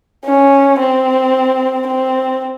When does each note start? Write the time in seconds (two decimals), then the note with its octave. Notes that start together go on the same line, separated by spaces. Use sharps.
0.25 C#4
0.79 C4
1.88 C4